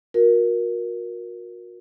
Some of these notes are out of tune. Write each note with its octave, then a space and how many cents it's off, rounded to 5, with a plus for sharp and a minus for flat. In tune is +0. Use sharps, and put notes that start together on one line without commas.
F#4 -35 A#4 +15